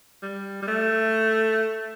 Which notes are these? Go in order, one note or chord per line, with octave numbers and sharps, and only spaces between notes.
G3
G3
A3